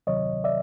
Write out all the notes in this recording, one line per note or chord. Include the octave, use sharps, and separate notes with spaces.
D2 C3 D#3 F#3 C#5 D#5
D5 E5